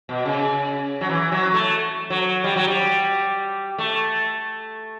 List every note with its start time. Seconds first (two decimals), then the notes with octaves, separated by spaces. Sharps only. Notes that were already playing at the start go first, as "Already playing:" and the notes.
0.09 B2
0.26 C#3
1.01 F#3
1.09 E3
1.32 F#3
1.54 A3
2.10 F#3
2.44 G3
2.56 F#3
2.67 G3
3.78 A3